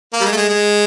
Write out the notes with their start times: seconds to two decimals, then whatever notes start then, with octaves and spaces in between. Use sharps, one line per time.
0.13 A#3
0.20 G3
0.25 G#3
0.32 A3
0.36 G#3
0.49 G#3